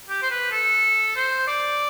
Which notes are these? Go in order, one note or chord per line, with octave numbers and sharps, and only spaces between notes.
G4
C5
B4
A4
C5
D5